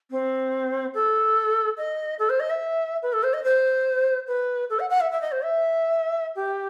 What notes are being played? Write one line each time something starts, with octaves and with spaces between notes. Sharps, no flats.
C4
A4
D#5
A4
C5
D#5
E5
B4
A4
C5
D#5
C5
B4
A4
F#5
F#5
E5
E5
D#5
C5
E5
G4